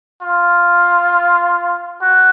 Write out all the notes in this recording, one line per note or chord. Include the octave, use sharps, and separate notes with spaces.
F4
F#4